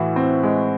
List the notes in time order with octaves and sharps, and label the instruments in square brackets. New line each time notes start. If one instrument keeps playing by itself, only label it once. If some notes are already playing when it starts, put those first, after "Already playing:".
Already playing: [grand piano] A2 E3 F#4
C4
G#3